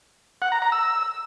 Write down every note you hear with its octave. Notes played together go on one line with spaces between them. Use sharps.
F#5
A#5
A#5
E6